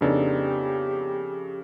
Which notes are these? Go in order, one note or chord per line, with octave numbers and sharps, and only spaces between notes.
F2 C#3 B3 D4 D#4 G4 A4